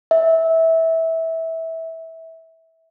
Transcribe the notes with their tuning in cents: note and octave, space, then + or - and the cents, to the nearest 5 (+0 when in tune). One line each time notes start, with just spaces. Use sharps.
E5 -20